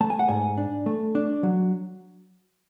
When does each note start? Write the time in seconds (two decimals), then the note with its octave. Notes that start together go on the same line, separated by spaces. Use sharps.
0.01 A3 A5
0.10 G#5
0.19 F#5
0.29 G#2 G#5
0.57 D4
0.86 A3
1.15 D4
1.43 F#3